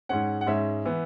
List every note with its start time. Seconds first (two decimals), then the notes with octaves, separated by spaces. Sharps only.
0.09 G#2 G#3 C#4 F#5
0.41 F#5
0.47 G#2 G#3 C#4 E5
0.85 E3 B3